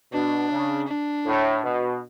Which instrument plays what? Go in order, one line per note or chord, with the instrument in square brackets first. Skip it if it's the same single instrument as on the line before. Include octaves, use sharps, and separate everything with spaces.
[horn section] B2 [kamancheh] D4
[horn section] C#3
[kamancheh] D4
[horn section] A2
B2